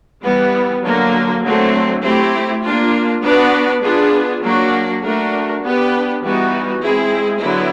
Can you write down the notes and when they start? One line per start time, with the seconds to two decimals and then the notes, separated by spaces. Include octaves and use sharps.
0.24 E3 G3 B3
0.83 D3 F#3 A#3
1.43 D3 F#3 A3 C4
2.03 A3 C4 E4 G4
2.63 A#3 D4 F4
3.22 B3 D4 F#4 B4 D5
3.83 B3 D4 F4 G#4
4.42 F#3 A#3 D4 F#4
5.02 A3 D4 F#4 A#4
5.62 B3 D4 G4 B4
6.22 E3 G3 B3 D#4 F#4
6.82 G#3 C4 E4 G#4
7.42 D3 F#3 B3 E4